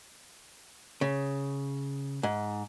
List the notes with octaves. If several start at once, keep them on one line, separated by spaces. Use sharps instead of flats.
C#3
G#2